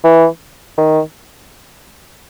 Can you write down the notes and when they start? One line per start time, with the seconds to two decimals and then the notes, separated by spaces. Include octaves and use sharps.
0.04 E3
0.78 D#3